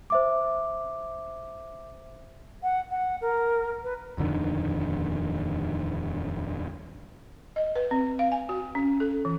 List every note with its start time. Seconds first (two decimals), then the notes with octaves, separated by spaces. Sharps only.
0.10 C5 E5 D6
2.63 F#5
2.90 F#5
3.21 A#4
3.83 B4
4.18 D#1 F2 D3 D#3
7.56 D#5
7.75 B4
7.91 C4
8.19 F5
8.32 G#5
8.49 F#4
8.75 C#4
9.00 A4
9.25 E3